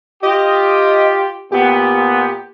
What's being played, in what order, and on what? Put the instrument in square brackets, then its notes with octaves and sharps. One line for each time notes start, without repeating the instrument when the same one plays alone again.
[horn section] F4 G4 [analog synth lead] D#5
[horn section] A#2 B3 [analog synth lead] G4